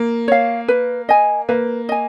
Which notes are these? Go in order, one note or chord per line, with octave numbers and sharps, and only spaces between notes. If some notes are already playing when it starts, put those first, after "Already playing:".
Already playing: A#3
C#5 F5
B4
D#5 G#5
A#3 B4
D#5 G#5